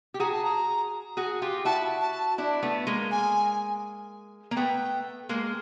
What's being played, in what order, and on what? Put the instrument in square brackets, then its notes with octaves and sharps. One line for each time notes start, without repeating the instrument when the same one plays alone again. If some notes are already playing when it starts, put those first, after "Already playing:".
[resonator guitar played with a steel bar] G4
[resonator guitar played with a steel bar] F#4 G#4 [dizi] A#5
[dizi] A5
A#5
[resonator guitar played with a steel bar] F#4 G#4
F4 G4
[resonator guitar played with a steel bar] E4 F#4 [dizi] A5
[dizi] A5
[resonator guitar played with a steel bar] D4 E4
A3 B3
G#3 A#3
[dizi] G#5
[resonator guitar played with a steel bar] A#3
[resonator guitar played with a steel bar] A3 B3 [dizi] G5
[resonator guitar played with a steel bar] G#3 A#3